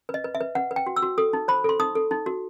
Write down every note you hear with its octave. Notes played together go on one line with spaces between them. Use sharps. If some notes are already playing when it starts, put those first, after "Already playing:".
B4
D#5
B4
E5
B4
B4 F#5
B4
G5
F#4
E6
F#4
A4 D#6
D#4
C5 B5
A4 C6
D#4 D#6
A4
D#4
F#4